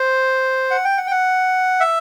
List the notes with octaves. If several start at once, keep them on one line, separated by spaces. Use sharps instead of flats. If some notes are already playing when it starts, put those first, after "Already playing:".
Already playing: C5
F#5
G5
F#5
G5
F#5
E5